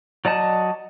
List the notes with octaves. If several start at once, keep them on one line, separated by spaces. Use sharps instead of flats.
F#3 D5 D#5 A5